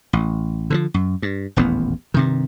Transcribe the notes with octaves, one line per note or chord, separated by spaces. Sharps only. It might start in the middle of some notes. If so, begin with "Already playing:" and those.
A1
D3 E3 F3
F#2
G2
D#1 A1 E2 B3
G2 C3 D#3